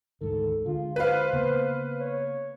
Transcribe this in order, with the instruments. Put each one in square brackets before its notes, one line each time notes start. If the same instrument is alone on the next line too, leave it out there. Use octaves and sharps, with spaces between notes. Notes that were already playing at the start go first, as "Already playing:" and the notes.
[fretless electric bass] D2 G#2 D#3 [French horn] A4
[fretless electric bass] D3 G#3 [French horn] F4
[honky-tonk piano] B4 F5 [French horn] C5
[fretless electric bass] C#3 A#3 B3
[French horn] C#5